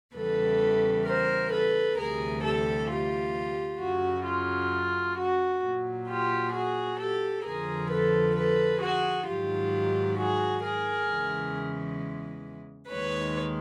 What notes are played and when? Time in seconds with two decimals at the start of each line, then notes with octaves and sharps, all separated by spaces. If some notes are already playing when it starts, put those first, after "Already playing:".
0.15 E2 C#3 E3 G3 A4 B4
1.05 A#4 C5
1.51 A4 B4
1.97 D2 C3 E3 G3 G#4 A#4
2.42 G4 A4
2.89 F4 G4
3.79 F#2 C#3 F#3 F#4
4.24 F4
5.17 F#4
5.62 A#2 F#3
6.07 F4 G4
6.52 F#4 G#4
6.98 G4 A4
7.43 F2 D3 F3 G#4 A#4
7.90 A4 B4
8.35 A4 B4
8.80 F#4 G#4
9.26 G#2 D#3 F#3 F4 G4
10.17 F#4 G#4
10.62 G#4 A#4
11.09 E2 C#3 E3 G#3
12.90 D#2 D#3 G#3 B4 C#5